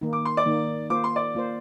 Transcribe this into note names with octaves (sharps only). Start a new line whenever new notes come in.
D#3 A#3 D#4
D6
C6
D5 D6
D#3 A#3 D#4
A#3 F4 C5 D6
C6
D5 D6
A#3 F4 C5